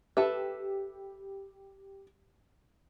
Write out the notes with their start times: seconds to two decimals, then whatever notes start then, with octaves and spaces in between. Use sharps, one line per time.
0.17 G4 A4 B4 E5